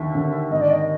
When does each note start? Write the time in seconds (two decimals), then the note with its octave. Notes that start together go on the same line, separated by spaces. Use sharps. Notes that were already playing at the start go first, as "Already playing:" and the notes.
Already playing: D#2 D3 E5
0.15 D3
0.51 G#1 D#5
0.61 D5
0.70 D#5